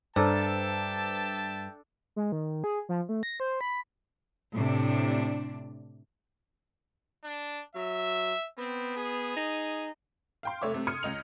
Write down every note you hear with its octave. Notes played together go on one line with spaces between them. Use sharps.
G2 D4 A4 C5 E5 G5 A5 A#5
G#3
D#3
G#4
F3
A3
A#6
C5
B5
A2 C3 D4
D4
F#3 E5
B3 C4
G#4
D#4
F5 G5 C6
F1 A3 C#5 E5 D6
C3 A3
C6 D#6 F6 G#6 C#7 D#7
C#2 D#5 F7